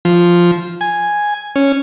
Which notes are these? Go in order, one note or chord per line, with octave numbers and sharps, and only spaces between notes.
F3
G#5
C#4